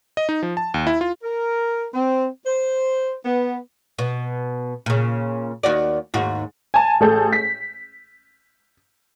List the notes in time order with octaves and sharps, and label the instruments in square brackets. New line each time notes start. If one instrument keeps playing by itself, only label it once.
[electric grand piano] D#5
D#4
F3
A5
D#2
E4
F4
[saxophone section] A#4
C4
C5
B3
[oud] B2
A#2 C#3
D#2 F#4 D5
D#2 G#2 F#4
[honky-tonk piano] G#5 A5
A1 G#4 A4 G6
B6